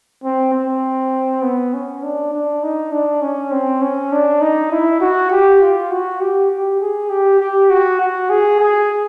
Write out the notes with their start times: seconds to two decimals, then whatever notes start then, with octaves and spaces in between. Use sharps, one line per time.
0.24 C4
0.54 C4
1.43 B3
1.74 C#4
2.03 D4
2.33 D4
2.63 D#4
2.92 D4
3.22 C#4
3.52 C4
3.82 C#4
4.12 D4
4.41 D#4
4.72 E4
5.01 F#4
5.31 G4
5.62 F4
5.91 F#4
6.21 G4
6.50 G4
6.81 G#4
7.10 G4
7.40 G4
7.70 F#4
8.00 F#4
8.30 G#4
8.59 G#4